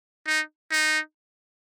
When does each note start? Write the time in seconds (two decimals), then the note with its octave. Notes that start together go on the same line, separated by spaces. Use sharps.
0.26 D#4
0.71 D#4